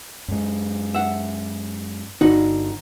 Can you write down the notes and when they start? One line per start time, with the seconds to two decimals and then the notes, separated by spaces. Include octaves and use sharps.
0.28 F#2 G#3
0.95 E5 F#5
2.21 G1 D3 D4 D#4 F#4